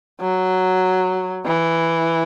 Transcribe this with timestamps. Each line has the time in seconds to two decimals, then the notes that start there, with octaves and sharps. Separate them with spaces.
0.21 F#3
1.45 E3